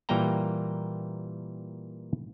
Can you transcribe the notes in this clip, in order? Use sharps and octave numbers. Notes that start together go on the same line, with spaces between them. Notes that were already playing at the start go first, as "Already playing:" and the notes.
A#2 E3 G3 A#3 G5 A#5